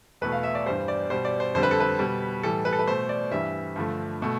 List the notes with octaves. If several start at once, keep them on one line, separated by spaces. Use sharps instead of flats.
E2 B2 A3 B4
F5
E5
D5
G2 E3 G3 C5
D5
B2 G3 C5
D5
C5
F2 D3 G3 C5
B4
A4
B4
B2 G3
A2 E3 G3 A4
B4
A4
B4
B2 A3 C5
D5
G2 E3 G3 E5
G2 D3 F3 A3
B2 A3